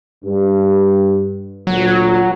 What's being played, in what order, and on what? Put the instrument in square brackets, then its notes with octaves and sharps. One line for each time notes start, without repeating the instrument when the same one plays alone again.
[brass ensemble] G2
[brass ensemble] D2 A#2 [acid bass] F#3